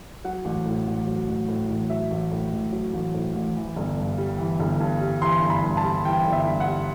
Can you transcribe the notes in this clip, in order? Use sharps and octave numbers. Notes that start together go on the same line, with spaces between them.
F#3 F#5
A1
A2
A1
F#3
A1
A2
A1
F#3 E5
A1
A2
A1
F#3
A1
A2
A1
E3
G1
G2
G3
E3
G1
G2
G3
E3 C6
G1
B5
G2
A5
G3
E3 G5
G1
E5
G2
F#5
G3